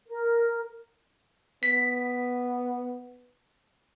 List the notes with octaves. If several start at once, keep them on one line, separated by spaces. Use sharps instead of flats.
A#4
B3 B6